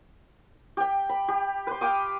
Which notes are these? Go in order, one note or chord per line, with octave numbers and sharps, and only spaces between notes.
G4 G5
B5
G4
B4 C6
F5 G5 D6 D#6